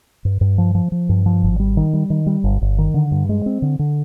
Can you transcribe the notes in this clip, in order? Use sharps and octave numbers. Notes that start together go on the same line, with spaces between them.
G2
G2
F3
F3
F3
G2
F3
G#1
G3
D#3
G3
D#3
G3
G1
G1
D#3
D3
G2
G#3
C4
D3
D3